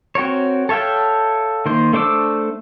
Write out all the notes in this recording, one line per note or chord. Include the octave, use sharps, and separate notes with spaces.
C4 F#4 A#4 C#5
A4 C#5 E5 F5 G5
D#3 A#3 C5
A3 D4 C5 D6 E6